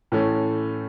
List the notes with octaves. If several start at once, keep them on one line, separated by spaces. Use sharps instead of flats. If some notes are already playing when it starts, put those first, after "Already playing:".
A2 E3 A3 C#4